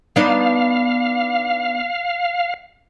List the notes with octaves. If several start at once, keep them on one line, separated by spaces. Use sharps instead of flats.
B3 D4 D#4 F5